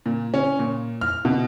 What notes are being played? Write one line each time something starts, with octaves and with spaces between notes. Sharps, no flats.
A#2
C#4
A#2
F6
B2